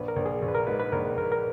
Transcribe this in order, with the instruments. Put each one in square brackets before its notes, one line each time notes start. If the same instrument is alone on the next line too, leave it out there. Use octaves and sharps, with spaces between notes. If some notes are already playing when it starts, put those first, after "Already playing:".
Already playing: [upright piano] A#1 [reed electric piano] B4
[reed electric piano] A#4
[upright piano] A#1
[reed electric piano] G#4
[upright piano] A#1
[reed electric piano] B4
A#4
[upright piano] G#2 [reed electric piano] B4
[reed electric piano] B4
[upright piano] A#1 [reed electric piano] A#4
[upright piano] A#1 [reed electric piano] A#4
[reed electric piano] B4
A#4